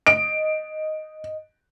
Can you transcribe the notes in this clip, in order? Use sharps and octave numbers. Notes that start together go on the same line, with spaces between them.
D#5 D7